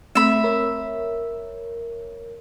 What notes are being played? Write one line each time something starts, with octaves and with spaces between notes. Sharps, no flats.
A3 C4 E5 B5
A#4 C#5